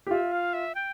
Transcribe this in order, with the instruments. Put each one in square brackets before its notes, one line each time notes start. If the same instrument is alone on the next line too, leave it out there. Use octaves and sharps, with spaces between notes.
[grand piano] G4
[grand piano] F4 [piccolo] E5
[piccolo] F5
E5
G5